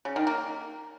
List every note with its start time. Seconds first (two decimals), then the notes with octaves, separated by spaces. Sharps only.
0.05 C#3
0.16 D#3
0.27 A#3